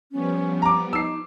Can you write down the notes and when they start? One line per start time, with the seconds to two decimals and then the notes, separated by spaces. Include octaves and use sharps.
0.12 F3 G3 B3 C#4
0.62 A#5 D6
0.93 D#4 E6 C7